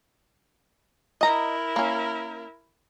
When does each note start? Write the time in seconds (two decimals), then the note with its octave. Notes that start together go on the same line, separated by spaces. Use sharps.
1.21 E4 A#4 D#5 A#5
1.76 A#3 C#4